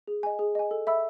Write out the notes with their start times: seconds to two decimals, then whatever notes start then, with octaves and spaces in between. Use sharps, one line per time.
0.07 G#4
0.23 D#5 G#5
0.39 G#4
0.55 D#5 G#5
0.71 A4
0.87 E5 B5 E6